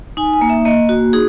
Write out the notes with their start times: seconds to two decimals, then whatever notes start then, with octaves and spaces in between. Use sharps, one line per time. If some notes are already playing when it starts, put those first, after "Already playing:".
0.17 D#4 G#5
0.33 G#5
0.41 A#3
0.50 E5
0.65 A#3 D#5
0.89 F#4
1.13 D#4 G#4